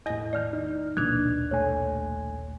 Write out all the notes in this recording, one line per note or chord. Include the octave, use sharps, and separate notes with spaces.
E2 A2 D#5 A#6
D#3 A3 D5 F6
D#4
A#1 D#2 B2 D4 F#6 G#6
C2 A3 C#5 G#5